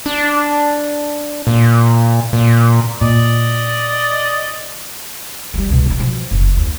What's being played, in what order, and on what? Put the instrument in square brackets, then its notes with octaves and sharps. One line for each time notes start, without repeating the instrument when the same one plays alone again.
[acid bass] D4
A#2
A#2
[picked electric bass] A#2 [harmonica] D5 D#5
[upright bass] F#3 G3
C#2 B2
C4 D4
B2 F3
F#1
D#2